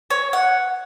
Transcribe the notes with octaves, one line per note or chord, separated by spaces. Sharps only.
C#5
F#5